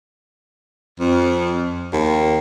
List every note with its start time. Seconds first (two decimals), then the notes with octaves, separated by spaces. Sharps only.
1.00 F2
1.93 D#2